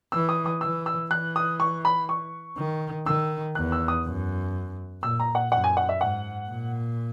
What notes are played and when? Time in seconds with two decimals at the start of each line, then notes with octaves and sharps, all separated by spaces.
0.12 E3 E6
0.29 D#6
0.46 D#6
0.61 E3 E6
0.86 E6
1.10 E3 F#6
1.36 D#6
1.60 C#6
1.85 B5
2.09 C#6
2.57 D#3
3.06 D#3 E6
3.55 E2 F#6
3.72 E6
3.88 D#6
4.04 F#2
5.03 A#2 E6
5.20 A#5
5.35 F#5
5.51 F#2 F#5
5.64 G#5
5.77 F#5
5.89 E5
6.00 G#2 F#5
6.49 A#2